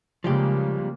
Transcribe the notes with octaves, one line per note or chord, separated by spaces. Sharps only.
C#3 F3 G3 G#3 A#3 G4